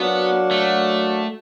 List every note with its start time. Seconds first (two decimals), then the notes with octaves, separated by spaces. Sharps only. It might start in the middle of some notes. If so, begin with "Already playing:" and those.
Already playing: F#3 A#3 B3 D4 F#4
0.51 A3